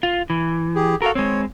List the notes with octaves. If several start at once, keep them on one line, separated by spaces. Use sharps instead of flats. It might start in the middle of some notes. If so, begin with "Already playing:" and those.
F4
E3
G4 G#4
F#4 A4 A#4 F5
G#3 C4 C#5